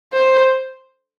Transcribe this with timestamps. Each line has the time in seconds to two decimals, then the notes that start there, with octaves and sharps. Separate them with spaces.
0.14 C5